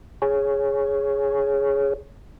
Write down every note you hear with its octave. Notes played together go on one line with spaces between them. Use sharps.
G#4 C#5